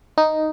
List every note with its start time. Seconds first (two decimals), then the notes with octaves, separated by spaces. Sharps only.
0.18 D#4